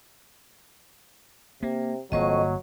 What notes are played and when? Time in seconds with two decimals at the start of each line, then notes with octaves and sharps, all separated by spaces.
1.63 C3 A#3
2.12 G1 F2 F#3 A#3 D#5 C#6